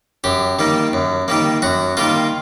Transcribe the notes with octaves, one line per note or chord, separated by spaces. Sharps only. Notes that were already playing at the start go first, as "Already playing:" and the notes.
F#2 G4
D#3 G3 A#3
F#2
D#3 G3 A#3
F#2 F#4
D#3 G3 A#3 F4